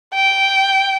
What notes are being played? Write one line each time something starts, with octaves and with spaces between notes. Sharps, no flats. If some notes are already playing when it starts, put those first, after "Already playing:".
G5